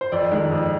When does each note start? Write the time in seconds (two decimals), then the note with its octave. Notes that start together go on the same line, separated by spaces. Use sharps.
0.01 C5
0.12 F2 D5
0.31 D#3 G#3
0.51 F2